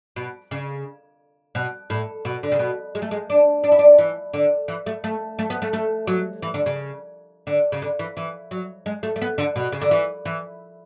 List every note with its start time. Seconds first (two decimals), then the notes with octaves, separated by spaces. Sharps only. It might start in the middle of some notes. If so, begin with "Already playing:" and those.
0.16 B2
0.51 C#3
1.55 B2
1.90 A2
2.25 B2
2.43 D3
2.52 C#3
2.59 B2
2.95 G#3
3.02 A3
3.11 G#3
3.30 D4
3.64 D4
3.72 E4
3.79 D4
3.99 E3
4.34 D3
4.68 E3
4.86 A3
5.04 A3
5.39 A3
5.50 B3
5.62 A3
5.73 A3
6.07 F#3
6.42 E3
6.54 D3
6.66 C#3
7.47 D3
7.72 C#3
7.82 D3
7.99 E3
8.17 E3
8.51 F#3
8.86 G#3
9.03 A3
9.16 A3
9.22 B3
9.38 D3
9.56 B2
9.72 C#3
9.82 D3
9.91 E3
10.25 E3